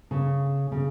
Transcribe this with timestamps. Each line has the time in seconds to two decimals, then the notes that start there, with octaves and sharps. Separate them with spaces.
0.11 C#3
0.72 C#3